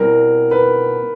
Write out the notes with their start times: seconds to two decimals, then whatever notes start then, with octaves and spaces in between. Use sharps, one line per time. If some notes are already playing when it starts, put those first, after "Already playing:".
Already playing: B2 G3 C4 E4 A#4
0.51 B4